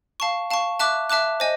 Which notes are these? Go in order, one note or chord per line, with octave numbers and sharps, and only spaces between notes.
F5 A5 C#6
F5 A5 C#6
E5 A5 D6 F#6
E5 A5 D6 F#6
C5 D#5 G#5